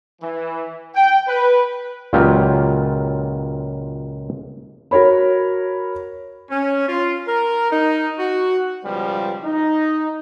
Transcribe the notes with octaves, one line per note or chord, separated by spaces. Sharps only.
E3
G5
B4
C#2 A#2 F#3 F4 G4
F#4 A#4 C#5 B5
C#4
F4
A#4
D#4
F#4
C#2 B2 F3 G3
D#4